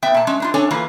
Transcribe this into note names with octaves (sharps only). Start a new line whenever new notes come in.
B3 E5 G5
A#2 A5
G#3 C#4
D4 D#4 F4
C#4 D4 A4 C#5 G#5
E2 E3 A#3 F4